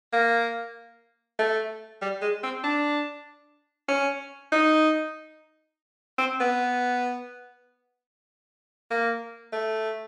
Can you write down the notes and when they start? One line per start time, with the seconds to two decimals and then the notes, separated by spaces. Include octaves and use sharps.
0.13 A#3
1.39 A3
2.02 G3
2.22 G#3
2.43 C4
2.64 D4
3.88 C#4
4.52 D#4
6.18 C4
6.40 B3
8.91 A#3
9.53 A3